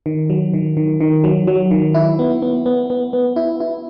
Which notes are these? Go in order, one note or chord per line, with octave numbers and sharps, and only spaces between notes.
D#3
F#3
D#3
D#3
D#3
F#3
F#3
D#3
E4
B3
B3
B3
B3
B3
E4
E4